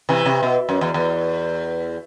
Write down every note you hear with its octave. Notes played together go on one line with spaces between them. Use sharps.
C3 E3
C3
B2
F#2
E2
E2